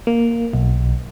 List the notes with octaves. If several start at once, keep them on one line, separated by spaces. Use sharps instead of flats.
A#3
B1